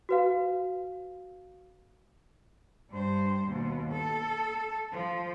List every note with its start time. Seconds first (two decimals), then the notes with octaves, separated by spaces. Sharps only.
0.09 F#4 B4 F5
2.90 G2 C5
3.48 D#2 B2
3.92 A4
4.92 F3